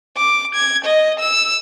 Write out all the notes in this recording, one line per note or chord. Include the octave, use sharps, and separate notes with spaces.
D6
G#6
D#5
E6